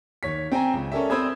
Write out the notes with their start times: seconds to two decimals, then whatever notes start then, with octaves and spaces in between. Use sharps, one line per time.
0.23 D#2 C#5 B6
0.52 C4 G5 G#5 A#5
0.74 C#2
0.92 C#4 A4 A#4 D5 E5
1.10 C4 C5 B5 D#6 E6 G#6